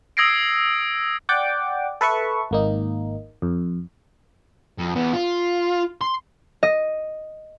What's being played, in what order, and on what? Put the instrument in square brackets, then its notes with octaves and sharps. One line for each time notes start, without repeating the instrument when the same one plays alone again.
[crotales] D#6 E6 G#6 A#6 C7 D7
[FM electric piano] D5 F#5 G5 D6
A4 B4 E5 C#6
G#1 A#3 D#4
F2
[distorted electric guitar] F2
E2 B3
F4
C6
[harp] D#5